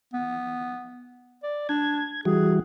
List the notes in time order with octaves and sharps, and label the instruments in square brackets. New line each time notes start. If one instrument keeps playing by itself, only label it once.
[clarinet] B3
D5
[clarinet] D4 [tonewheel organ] G#6
[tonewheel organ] E3 G3 F#4 [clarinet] G#4